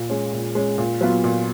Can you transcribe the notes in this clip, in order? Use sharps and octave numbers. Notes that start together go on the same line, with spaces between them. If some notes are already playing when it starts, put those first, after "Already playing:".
Already playing: A#2
G#3 C#4
A#2
G#3 C#4
A#2
F#3 B3 F4
A#2